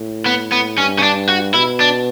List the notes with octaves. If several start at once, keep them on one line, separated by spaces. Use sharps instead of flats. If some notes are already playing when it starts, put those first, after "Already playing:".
Already playing: A2
B3
B3
G2 C#4
C#4
D4
F#4
B2 E4
D4